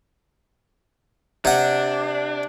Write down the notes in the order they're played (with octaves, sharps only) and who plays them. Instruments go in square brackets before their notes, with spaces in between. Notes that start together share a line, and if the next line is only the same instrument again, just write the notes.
[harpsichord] C3 F#5 [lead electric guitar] D4